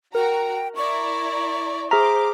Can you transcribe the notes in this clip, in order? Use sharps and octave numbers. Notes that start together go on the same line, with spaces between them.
F#4 A#4 G5 A#5
E4 D5 A#5 C#6
G#4 C5 E5 A#5 D6 F6 B6